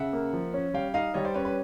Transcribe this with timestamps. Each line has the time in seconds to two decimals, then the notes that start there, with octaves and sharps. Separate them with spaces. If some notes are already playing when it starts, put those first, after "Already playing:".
Already playing: C#3 E5 F#5
0.13 A#3
0.33 F3
0.54 C#4
0.74 G3 F5 G5
0.94 D#4 D#5 F5
1.14 G3 C#5 D#5
1.25 C5 D5
1.34 C#4 B4 C#5
1.45 B4